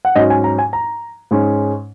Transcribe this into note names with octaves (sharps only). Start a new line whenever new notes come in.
F#5
G#2 F#3 C#4 D#5
G#5
A#5
G#5
A#5
G#2 G#3 C#4